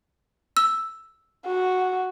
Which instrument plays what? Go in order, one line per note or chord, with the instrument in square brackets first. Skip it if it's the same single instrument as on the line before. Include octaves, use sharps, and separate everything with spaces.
[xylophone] E6
[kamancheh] F#4